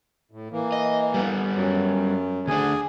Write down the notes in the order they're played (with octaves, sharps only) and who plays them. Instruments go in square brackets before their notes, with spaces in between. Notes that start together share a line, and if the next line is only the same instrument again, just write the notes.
[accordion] A2
E3 A#3
[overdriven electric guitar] D#5
G3 B3
[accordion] F#2 F#3
[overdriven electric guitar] D2 D4 [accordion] G#4 G#5